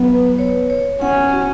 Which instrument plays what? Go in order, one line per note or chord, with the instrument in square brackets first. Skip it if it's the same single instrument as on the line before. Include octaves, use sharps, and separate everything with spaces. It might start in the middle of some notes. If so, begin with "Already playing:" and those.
Already playing: [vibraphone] F#3 [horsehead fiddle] B3
[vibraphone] B4
C#5
C#5
[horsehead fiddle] C#4 [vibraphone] F#5
[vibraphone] F#4